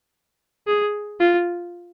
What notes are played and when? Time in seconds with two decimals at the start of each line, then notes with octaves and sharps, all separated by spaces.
0.67 G#4
1.20 F4